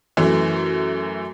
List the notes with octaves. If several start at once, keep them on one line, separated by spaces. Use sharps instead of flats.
F#2 E3 A3